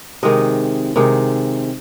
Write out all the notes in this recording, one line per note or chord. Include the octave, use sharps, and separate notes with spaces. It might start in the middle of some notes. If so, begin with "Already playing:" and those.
C3 D#3 G#3 D#5
C3 D#3 G#3